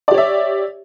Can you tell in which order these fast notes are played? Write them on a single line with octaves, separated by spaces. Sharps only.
D5 G4 C#5 E5